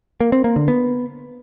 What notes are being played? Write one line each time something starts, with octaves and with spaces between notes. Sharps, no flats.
A#3
C4
A#3
D3
B3